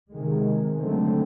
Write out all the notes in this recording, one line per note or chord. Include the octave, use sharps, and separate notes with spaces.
C3 D#3 G#3
D3 F#3 A3 C4